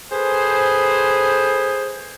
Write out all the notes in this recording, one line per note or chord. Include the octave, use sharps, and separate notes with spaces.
G#4 A4 B4 C5